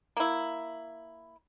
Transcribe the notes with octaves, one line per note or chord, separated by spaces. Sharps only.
A#3 E4